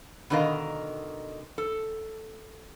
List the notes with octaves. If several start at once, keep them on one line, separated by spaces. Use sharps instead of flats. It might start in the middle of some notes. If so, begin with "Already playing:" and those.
B2 D3 D#3 A#4 D#5 F5
A4